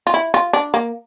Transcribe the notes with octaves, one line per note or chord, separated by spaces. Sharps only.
F4
E4
F4
D4
A#3